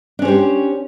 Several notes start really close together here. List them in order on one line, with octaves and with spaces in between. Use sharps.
D4 C#4 C5 G4